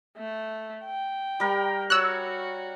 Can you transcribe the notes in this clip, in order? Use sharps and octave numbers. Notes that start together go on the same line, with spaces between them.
A3
G5
G3 A#4
F#4 C#5 E6 F#6